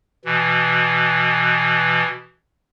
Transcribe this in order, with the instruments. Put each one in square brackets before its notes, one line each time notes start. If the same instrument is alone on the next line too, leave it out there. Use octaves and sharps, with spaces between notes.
[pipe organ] B2 E3